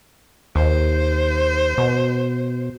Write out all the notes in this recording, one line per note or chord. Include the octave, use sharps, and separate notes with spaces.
D#2 C5
B2